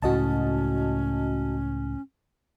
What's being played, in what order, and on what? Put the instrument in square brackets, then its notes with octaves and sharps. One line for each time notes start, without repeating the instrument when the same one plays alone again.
[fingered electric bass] C#2 A2 [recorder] C#4 [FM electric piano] F#4 D#5 A5